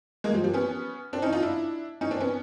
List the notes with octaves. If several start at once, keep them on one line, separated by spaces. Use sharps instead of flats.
G#3 A#3
F3 G3
F3 G3
B3 C#4
C4 D4
C#4 D#4
D#4 F4
D4 E4
C#4 D#4
C4 D4
B3 C#4